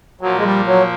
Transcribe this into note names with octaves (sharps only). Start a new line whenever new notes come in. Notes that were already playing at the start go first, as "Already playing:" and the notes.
A#2 F3 F#3 A#3
G#3
G3
F#3